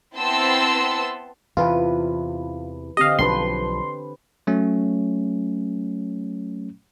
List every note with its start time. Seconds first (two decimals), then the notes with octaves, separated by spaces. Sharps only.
0.16 B3 C4 E4 A5 C6 E6
1.57 E2 C3 E3 F4 B4
2.97 D3 C4 G4 D#5 F5
3.19 B1 F3 D4 B4 C6
4.47 F#3 A3 C#4